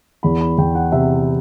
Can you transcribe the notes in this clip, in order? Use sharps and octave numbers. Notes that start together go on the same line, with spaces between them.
E2 B5
B5
E2 G5
F#5
C3 E5